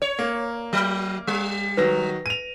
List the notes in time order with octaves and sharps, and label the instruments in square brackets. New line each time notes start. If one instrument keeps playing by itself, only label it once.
[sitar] C#5
[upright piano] A#3
[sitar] F#3
G3
[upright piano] D#3 F#3 A#6 [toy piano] B4
[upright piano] D#7 F7